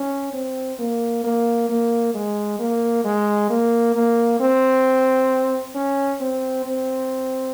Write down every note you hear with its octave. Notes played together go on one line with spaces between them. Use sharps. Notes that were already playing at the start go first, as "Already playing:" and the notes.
Already playing: C#4
C4
A#3
A#3
A#3
G#3
A#3
G#3
A#3
A#3
C4
C#4
C4
C4